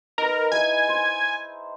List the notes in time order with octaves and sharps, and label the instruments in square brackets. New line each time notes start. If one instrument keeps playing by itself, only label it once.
[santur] D#4 B4 [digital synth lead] A#4
[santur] D#4 E4 G#4 [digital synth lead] G#5
[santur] C5